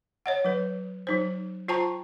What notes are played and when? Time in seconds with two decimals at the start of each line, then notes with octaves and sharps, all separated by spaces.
0.26 C#5 D#5 F#5
0.45 F#3 B4
1.07 F#3 D#4 C5
1.68 F4 C5 G5 A5 A#5 C#6